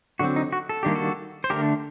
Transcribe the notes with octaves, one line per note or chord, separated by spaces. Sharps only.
D3 F#3 C4 F#4
D#4
F#4
A4
D#3 G3 A#3 D4 G4
F#4 A4
C5
D3 A3 D4 G4 A#4